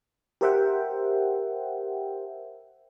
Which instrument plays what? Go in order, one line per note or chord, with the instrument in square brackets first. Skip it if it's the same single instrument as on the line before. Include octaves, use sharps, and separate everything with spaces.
[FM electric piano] G4 A#4 C5 E5 F#5 G5